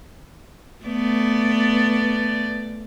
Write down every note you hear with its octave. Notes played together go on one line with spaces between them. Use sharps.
A3 B3 D5